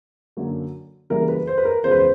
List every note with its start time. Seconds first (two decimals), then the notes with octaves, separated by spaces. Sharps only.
0.37 F#2 D3 F#3 A#3
1.10 C#3 E3 G3 A#3 A#4
1.29 B4
1.47 C5
1.58 B4
1.65 A#4
1.83 E2 C#3 F3 G#3 C5
1.91 B4
1.99 C5